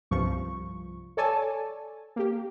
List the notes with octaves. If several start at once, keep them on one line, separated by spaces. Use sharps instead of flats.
C2 G2 F3 C#6
A4 C#5 D5 G#5 A5
A#3 G4